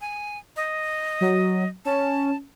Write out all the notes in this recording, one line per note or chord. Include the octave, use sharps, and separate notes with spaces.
G#5
D#5
F#3
C#4 A5